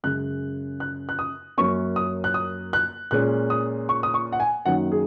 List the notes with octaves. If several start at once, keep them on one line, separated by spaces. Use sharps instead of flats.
F#2 C#3 G#3 F#6
F#6
F#6
D#6
F#2 F#3 A#3 C#4 C#6
D#6
F#6
D#6
F#6
A#2 G#3 C#4 F#6
D#6
C#6
D#6
C#6
F#5
G#5
F#2 D#3 F#3 A#3 F#5
G#4